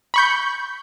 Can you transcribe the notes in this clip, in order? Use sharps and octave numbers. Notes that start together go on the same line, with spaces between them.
B5 C#6 G6